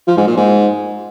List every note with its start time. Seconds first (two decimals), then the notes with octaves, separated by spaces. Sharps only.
0.07 F3
0.17 G#2
0.27 A#2
0.37 G#2